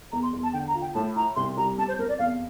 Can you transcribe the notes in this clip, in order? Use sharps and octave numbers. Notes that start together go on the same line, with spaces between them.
E2 A#5
C6
E2
A5
D3 G5
A#5
F4
G5
A2 A5
E4 A#5
C2 C6
G3 A#5
F2 A5
C5
F2 A#4
D5
E2 F5